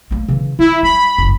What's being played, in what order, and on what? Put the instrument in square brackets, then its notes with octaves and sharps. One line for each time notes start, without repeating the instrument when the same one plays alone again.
[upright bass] A3 A#3
C#3 E3
[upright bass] D3 [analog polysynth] E4
[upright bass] G3 [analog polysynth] B5
[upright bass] F#1 G2